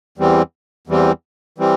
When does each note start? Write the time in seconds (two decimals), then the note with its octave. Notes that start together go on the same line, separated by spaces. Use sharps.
0.18 E2 E3 G3 C4
0.87 E2 E3 G3 C4
1.58 E3 G3 C4